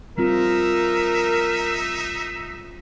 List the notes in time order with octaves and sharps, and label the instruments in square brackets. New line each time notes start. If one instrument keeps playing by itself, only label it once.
[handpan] G3 C4 F4 [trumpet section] D#4 E5 [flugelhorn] A#4